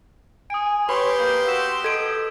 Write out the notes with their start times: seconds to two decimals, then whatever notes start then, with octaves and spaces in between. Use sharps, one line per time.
0.50 G#5 D#6 D7
0.89 G4 B4 C#5 B5 C6
1.19 A#3 G6
1.47 F#4 E6 B6 E7
1.84 A4 D#5 G#6 D7